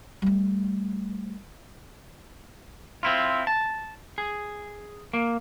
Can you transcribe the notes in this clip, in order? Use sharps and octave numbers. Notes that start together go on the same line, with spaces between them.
G3 A3
C4 E4 F4
A5
G#4
A#3